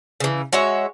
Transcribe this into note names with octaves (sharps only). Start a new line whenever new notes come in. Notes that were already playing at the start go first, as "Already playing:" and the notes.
C#3 E3
G#3 F#4 C#5 E5